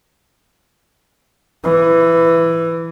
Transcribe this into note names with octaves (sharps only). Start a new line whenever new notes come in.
E3